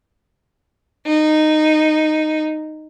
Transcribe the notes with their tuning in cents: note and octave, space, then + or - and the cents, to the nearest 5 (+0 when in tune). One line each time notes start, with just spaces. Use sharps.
D#4 -10